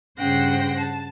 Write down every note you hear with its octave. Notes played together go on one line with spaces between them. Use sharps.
G2 C#3 C5 F#5 G5 A#6
A5